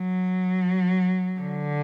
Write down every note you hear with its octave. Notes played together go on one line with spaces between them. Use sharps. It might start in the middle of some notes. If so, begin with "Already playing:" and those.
Already playing: F#3
D3